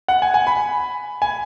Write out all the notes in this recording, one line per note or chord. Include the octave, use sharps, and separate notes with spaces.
F#5
G#5
G#5
B5
G#5